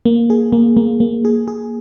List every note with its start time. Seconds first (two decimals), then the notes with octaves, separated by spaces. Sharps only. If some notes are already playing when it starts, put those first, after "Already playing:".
0.05 A#3
0.30 G#4
0.52 A#3
0.77 A#3
1.00 A#3
1.25 G#4
1.48 G#4